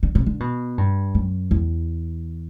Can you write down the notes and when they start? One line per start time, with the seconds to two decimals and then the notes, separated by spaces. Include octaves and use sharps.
0.03 D3
0.15 C3
0.26 D3
0.40 B2
0.78 G2
1.15 F#2
1.51 E2